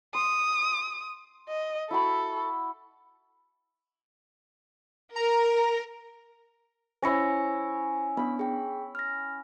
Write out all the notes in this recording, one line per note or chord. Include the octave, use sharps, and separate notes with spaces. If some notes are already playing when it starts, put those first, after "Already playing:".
C6 D#6
D#5
E4 F#4 A4 B5
A#4 A#5
C#4 E4 C5 C#5 A#6 C#7
B3 D4 B5
G#4 G5
F6 A#6